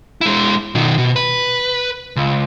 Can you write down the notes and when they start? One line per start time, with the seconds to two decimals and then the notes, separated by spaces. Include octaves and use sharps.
0.21 G#3 E4
0.75 B2 D#3
0.98 B2
1.16 B4
2.16 C#2